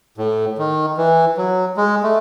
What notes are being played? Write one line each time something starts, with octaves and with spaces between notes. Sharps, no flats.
A2
D#3
E3
F#3
G#3
A3